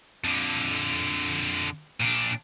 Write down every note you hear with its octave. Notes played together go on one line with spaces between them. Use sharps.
F2 D3
A#2 D4